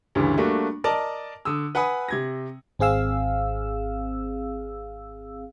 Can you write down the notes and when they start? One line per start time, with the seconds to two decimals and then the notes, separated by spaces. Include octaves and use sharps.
0.15 D2 G2 C#3 E3 C#4
0.37 G3 A3 A#3 D4 F#4
0.84 A#4 D5 D#5 A5
1.45 D3 D#6 E6
1.75 B4 F#5 G#5 B5 D#6
2.08 C3 G#6 A#6
2.79 G#1 C4 G#4 F5 E6